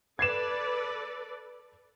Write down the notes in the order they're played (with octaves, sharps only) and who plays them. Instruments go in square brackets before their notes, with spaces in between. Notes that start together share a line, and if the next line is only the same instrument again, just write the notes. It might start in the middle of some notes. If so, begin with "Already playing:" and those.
[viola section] A4 B4 D5 [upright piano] G#6 C7 E7